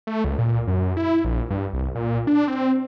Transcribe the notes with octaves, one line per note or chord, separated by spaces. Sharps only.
A3
C#2
A#2
F#2
E4
A#1
G2
C2
A#2
D4
C4